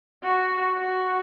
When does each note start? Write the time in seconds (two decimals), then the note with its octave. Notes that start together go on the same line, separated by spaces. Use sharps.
0.23 F#4
0.78 F#4